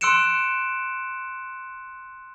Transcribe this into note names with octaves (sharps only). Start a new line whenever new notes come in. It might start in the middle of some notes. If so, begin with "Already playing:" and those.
C6 E6 F#6 C#7 D7 E7